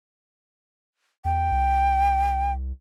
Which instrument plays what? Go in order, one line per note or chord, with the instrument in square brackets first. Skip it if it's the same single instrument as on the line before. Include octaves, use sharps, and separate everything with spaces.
[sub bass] E2 [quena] G5
[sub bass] C2